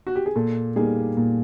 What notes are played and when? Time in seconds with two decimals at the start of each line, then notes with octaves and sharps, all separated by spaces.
0.07 F#4
0.16 G4
0.26 G#4
0.36 A#2 A4
0.76 G3 A#3 D#4 G#4
1.17 A#2